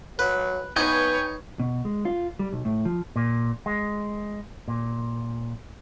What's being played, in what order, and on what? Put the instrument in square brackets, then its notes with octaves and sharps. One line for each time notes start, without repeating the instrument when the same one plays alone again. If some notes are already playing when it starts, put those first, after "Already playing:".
[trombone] F#3 [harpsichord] B4
[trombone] B3 [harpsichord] D#4 [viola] B4 C#5 [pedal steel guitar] G5 G#5 C#6
[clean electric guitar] B2
G#3
F4
G3
B1
A2
F3
A#2
G#3
A#2